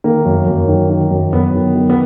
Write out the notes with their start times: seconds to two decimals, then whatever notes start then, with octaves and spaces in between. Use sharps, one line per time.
0.04 D#3 A#3
0.25 F#2
0.47 F#2
0.68 D#3
0.90 D#3
1.11 F#2
1.33 F#2 B3
1.55 D#3
1.75 D#3
1.90 B3